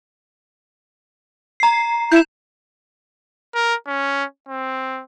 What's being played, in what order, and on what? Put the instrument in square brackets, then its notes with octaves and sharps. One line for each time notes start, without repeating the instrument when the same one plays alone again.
[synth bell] A#5 C7
[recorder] E4 [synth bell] G6 E7
[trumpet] A#4
C#4
C4